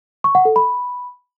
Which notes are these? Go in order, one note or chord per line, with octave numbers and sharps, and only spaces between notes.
C#6
F#5
A4
B5